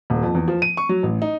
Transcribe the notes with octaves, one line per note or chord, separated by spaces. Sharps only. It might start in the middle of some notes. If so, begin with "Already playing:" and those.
D#1
F2
E2
F3
D#7
C#6
F#3
A1
D#4